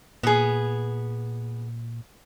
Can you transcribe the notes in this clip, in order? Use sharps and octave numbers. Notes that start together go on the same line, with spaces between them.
A#2 B3 G#4